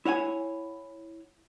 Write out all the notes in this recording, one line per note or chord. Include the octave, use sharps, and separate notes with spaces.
E4 C#5 F#5 G#5